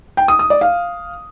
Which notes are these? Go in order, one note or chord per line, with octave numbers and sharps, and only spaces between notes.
G5
D#6
D#6
D5
F5